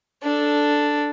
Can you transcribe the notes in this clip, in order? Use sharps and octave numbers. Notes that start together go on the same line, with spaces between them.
D4 A4